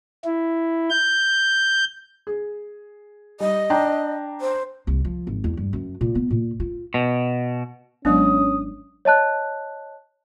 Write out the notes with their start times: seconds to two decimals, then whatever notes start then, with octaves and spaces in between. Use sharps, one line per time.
0.25 E4
0.90 G6
2.27 G#4
3.40 G3 D#5
3.70 D4 G5 A#5
4.41 C5
4.87 C2
5.05 F3
5.27 G#1
5.44 E2
5.57 G2
5.73 F#2
6.01 A#2
6.15 B3
6.30 A#2
6.60 F4
6.94 B2
8.05 G#1 F#3 G#3 B3 C#4 D4 D#6
9.05 C#5 D#5 A5 F#6